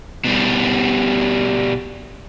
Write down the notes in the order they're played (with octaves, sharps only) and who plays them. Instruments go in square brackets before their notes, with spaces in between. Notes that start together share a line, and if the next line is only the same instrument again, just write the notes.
[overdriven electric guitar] B2 G3